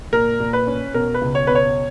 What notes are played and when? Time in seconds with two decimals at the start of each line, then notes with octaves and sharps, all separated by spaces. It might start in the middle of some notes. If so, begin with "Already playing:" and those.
0.13 A#2 A#4
0.40 A#2
0.53 B4
0.67 C#4
0.94 B2 A#4
1.14 B4
1.21 C#2
1.35 C#5
1.47 B2 B4
1.55 C#5